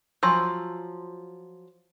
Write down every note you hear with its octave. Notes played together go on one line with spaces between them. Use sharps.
F3 F#3 G#5 C6 E6